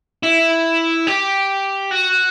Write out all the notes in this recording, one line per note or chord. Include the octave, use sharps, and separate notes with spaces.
E4
G4
F#4